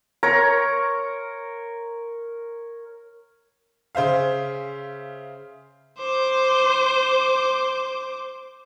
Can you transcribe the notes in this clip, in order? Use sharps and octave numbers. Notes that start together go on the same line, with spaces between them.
A#4 C#5 A#5
C#3 C5 E5 F5
C5 D6